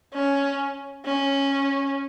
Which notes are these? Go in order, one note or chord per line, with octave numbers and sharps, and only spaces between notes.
C#4
C#4